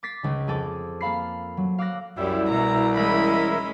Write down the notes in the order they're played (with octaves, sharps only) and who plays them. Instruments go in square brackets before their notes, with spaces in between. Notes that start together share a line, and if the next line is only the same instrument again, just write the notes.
[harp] D6 A6 B6 C7
C#2 C#3
F2 G#4 A4 D6
A#3 A4 F5 B5 C7
F#3
F5 D6 E6 F#6 A#6
[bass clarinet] C2 [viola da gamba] F#2 [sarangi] G3 [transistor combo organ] E4
[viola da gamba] B2 [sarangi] A#5
[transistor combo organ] E3 E4 A#4 [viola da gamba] G#3 C#4 [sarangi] B5